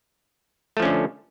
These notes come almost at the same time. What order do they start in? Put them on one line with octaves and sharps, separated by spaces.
A3 F3 C#4 D3